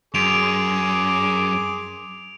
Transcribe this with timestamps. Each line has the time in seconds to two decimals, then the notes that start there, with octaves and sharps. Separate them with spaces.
0.14 F#2 G#4 C6 D6 D7 F7